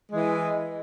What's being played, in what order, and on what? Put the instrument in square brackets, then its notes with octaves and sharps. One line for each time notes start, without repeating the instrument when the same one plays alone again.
[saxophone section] E3 G#3